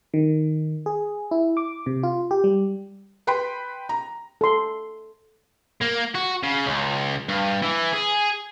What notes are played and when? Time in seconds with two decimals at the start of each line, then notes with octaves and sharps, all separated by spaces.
0.14 D#3
0.86 G#4
1.31 E4
1.57 D6
1.86 C3
2.03 F4
2.31 G4
2.44 G3
3.27 B4 G5 B5 C6
3.89 A#5
4.41 A4 C6
5.82 A#3
6.15 F#4
6.43 C#3
6.66 C#2
7.29 G2
7.62 E3
7.93 G#4